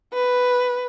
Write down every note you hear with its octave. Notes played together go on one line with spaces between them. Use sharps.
B4